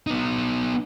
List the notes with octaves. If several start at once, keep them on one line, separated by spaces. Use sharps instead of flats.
B3 D#4